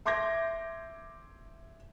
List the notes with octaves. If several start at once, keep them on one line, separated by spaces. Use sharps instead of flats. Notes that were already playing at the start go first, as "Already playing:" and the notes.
E5 C6 D6 G6 G#6 A#6